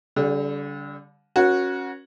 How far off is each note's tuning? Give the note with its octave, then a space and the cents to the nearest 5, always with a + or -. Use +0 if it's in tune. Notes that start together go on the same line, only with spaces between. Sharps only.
D3 -35 G3 +0
C#4 -10 F#4 -15 A#4 +40